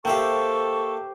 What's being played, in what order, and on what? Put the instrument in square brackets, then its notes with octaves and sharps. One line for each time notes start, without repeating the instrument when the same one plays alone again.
[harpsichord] A#3 E5 F5 [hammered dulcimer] G4 C5 G5 [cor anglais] A4 [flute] C#6